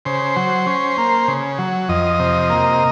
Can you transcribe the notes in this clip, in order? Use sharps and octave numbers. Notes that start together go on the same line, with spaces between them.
C#3 C5
F#3
C#4
A#3
C#3
F#3
F2 D#5
C3
A#3